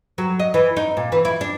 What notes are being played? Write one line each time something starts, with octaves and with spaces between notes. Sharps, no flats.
F#3
D#5
E3
D#4
A#2
E3
E4
D4